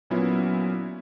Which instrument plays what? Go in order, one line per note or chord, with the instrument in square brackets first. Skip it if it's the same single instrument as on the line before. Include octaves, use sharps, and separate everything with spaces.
[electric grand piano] A#2 F#3 B3 C#4 E4 F4